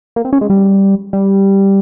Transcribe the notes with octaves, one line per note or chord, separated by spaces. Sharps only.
A#3
C4
C#4
G#3
G3
G3